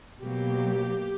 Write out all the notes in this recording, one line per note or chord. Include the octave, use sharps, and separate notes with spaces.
B2 F#3 A#3 G4